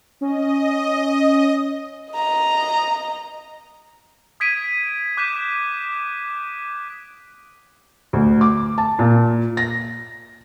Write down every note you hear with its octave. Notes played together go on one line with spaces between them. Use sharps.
C#4 D#5
D#5 A#5
D#6 G#6 B6 D7 D#7
D6 F#6 G6 B6 D#7 E7
D2
D6
A5
A#2
A#6